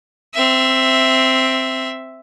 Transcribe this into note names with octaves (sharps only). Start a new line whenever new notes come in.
C4 E5